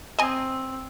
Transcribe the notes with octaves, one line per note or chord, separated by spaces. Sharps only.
C4 D#5 G#5